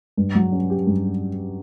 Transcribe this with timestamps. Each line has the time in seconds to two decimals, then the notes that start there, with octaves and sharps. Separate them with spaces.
0.17 G2
0.35 F#3
0.52 C#4
0.70 G4
0.87 G2